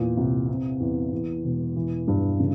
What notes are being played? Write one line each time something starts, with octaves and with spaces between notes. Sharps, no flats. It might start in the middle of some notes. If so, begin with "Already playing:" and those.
Already playing: E2 A#2
C2
C3
E2
E2
E1
E3
G2
C#3